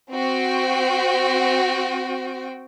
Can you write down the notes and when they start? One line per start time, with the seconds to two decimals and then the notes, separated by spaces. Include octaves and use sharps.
0.13 C4 F#4 G5